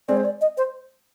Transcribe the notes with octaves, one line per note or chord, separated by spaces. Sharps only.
G#3 C4 D5
C5
D5
D#5
C5